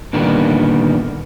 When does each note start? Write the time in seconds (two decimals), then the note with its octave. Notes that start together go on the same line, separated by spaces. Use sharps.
0.13 A#2 D3 D#3 G3 A#3 B3